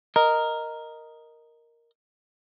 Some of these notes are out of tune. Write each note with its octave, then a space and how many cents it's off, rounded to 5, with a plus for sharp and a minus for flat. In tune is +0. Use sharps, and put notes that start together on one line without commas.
A#4 +0 D#5 +0